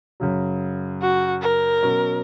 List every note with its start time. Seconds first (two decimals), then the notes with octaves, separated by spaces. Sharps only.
0.20 F#2 C#3 F#3
1.02 F#4
1.42 A#4
1.83 B2 F#3 C#4